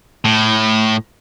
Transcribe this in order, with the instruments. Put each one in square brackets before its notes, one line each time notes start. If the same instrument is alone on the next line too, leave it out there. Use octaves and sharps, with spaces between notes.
[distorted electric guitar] A2